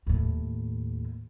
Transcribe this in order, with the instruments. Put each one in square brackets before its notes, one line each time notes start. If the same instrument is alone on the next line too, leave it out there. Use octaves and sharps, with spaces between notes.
[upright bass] D#2 A2